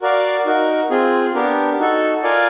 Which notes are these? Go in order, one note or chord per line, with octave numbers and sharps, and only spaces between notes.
F#4 A#4 D5 F5
D#4 F#4 A#4
C4 F4 G#4
B3 D4 G4 A#4
D#4 F#4 A4
F4 A#4 D5 F5 G#5